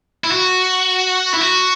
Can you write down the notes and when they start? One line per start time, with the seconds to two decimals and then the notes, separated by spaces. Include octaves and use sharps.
0.24 E4
0.32 F#4
1.34 E4
1.41 F#4